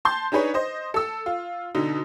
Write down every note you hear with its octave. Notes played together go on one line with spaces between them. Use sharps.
A5 C6 G6
D4 D#4 G#4 B4 C#5
C5 D#5
A4 E6
F4
B2 D3 D#4